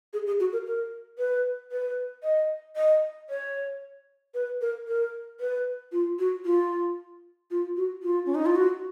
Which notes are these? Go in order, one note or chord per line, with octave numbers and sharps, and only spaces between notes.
G#4
G#4
F#4
A#4
A#4
B4
B4
D#5
D#5
C#5
B4
A#4
A#4
B4
F4
F#4
F4
F4
F#4
F4
C#4
D#4
F4
F#4